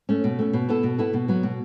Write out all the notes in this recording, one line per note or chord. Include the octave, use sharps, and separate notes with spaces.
A3 C#4
B2
A3 C#4
B2
B3 E4 A4
B2
B3 E4 A4
B2
F#3 B3
B2